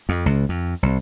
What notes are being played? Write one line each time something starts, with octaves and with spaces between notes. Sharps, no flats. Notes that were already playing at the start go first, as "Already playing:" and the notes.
F2
C#2
F2
C2